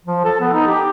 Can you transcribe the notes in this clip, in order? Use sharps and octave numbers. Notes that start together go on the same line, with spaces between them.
F3
A4
B3
D#4
G4